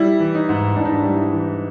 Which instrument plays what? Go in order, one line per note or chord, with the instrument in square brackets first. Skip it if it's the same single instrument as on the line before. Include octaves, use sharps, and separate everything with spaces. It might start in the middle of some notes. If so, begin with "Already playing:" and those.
Already playing: [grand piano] G3 E4
E3
D#4
G#2
G#2 D4
D#4
D4
G3
E4
D#4
E3